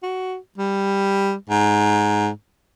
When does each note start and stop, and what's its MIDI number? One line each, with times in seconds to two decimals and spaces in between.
0.03 0.37 66
0.58 1.34 55
1.49 2.29 44